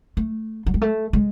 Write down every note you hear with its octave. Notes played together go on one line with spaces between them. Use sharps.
A3
F#3
G#3
A3
G#3